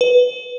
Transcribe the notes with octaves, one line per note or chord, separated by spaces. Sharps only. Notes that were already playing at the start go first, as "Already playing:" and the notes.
B4